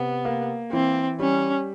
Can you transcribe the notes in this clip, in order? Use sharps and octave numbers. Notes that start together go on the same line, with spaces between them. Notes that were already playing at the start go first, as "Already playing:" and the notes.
Already playing: C3 B3
A#3
E3 C4
G3 C#4